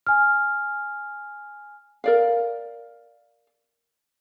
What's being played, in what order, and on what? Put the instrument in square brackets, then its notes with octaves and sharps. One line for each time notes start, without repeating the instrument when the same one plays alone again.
[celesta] G#5 F6
[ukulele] A#4 D5 F5